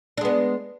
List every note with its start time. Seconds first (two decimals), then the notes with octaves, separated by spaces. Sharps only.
0.17 D4
0.21 G#3
0.25 B3